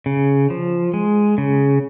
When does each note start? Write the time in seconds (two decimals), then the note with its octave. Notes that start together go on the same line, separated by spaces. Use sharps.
0.06 C#3
0.50 F3
0.94 G#3
1.38 C#3